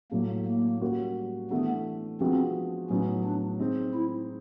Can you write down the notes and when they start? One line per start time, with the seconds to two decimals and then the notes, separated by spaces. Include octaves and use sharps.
0.11 A2 F#3 A3 A#3
0.46 A#3
0.81 G3 A#3 C#4 F#4
1.51 E3 A3 B3 D4
2.20 F3 G#3 B3 C4 D4 F#4
2.90 A2 F#3 B3 C#4 D#4
3.24 D4
3.59 G#3 C4 D#4
3.94 E4